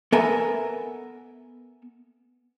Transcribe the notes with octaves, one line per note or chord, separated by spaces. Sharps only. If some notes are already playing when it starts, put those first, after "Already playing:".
B3 A4 A#4 E5 G#5